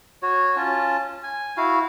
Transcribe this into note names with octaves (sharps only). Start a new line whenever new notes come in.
F#4 C#5
C#4 F4 A5
G#5
E4 F#4 F5